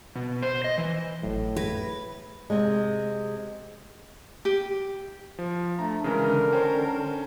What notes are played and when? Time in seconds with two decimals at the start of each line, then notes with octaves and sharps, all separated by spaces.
0.16 B2
0.42 C5
0.64 D#5
0.78 E3
1.23 G#1 A2 F#3
1.56 B4 B5 G#6 A#6
2.50 C3 G#3
4.45 G4
5.39 F3
5.79 A3 D4 A#5
6.04 C#3 E3 G#3 A#4
6.25 D3
6.52 C#4 C5 G5